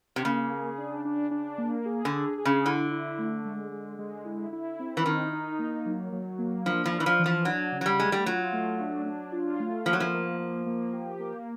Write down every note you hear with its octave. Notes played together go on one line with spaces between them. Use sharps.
C3
C#3 A#3
G#4
D4
D4
D4
A#3
G#4
D3
G#4
G#4
C#3
D3 E4
E4
A3
G#3
G#3
G#3
E4
E4
C4
E3
D#3 D#4
D#4
A#3
F#3
F#3
A#3
F3 D4
F3
D4
E3
F3
E3
F3
F#3 D4
C#3
F#3
G3
G#3 A3
G3
F#3 F4
A3
D4
D4
F4
A3
F3 A#3
F#3
F3
A#3
A#3
A#3
G4
A#3